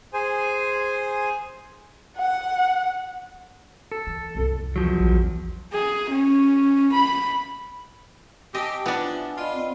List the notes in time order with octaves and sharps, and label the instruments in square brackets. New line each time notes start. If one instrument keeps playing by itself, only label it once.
[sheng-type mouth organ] G#4 C5 G#5
[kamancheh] F#5
[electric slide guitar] A4
[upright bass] E3
C2 F2
[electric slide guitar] E2 F3 F#3
[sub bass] A#1
[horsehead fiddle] G#4
C#4
B5
[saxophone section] C4 G4 [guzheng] D#5 [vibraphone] G#5 A5
[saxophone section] F3 E4 [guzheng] B3 D4
[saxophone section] F4 [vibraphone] D5 D#5 B5
[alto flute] C4